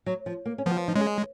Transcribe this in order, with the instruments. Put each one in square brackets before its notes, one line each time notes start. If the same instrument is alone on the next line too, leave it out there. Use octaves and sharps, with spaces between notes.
[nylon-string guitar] F#3
F3
A#3
C#4
[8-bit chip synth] F3 [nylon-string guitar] B3
[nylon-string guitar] D#4
[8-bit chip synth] G#3 [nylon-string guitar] C#4